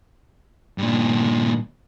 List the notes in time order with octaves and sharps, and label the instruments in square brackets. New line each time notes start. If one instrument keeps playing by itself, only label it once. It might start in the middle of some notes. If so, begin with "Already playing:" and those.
[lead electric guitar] G2 A#2